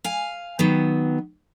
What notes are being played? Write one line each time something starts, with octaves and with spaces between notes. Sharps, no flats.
F5 G#5
D#3 F#3 B3